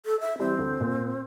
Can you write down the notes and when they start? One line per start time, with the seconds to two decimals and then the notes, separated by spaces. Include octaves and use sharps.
0.06 A4
0.20 E5
0.39 E3 G3 C4
0.59 D2
0.80 A#2